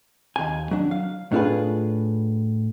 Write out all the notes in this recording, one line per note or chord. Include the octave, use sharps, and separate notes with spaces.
D#2 G#5
F#3 D4
F5
A2 D4 F4 G#4 B4